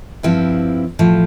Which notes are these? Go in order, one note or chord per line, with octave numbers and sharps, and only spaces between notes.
G2 F3 C4 E4
A2 F3 A3